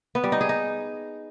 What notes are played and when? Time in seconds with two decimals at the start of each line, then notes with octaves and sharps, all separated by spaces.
0.15 B3
0.24 G3
0.32 D#4
0.41 G#4
0.49 D#4